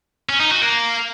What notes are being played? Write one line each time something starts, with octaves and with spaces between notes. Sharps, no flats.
C#4
D#4
F#4
A#3